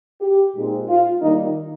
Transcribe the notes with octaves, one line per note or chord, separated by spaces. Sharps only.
G4
A#2 G#3 C4 D#4
F4
D#3 G3 A#3 D#4